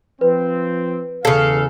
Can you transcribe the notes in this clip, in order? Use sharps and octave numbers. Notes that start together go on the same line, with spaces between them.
F3 C4 B4
E2 C#3 A4 F5